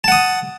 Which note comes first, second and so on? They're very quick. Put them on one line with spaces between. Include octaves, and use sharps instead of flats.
A5 F#5 D#6